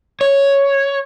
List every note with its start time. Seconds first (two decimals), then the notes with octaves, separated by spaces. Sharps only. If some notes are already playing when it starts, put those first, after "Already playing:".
0.21 C#5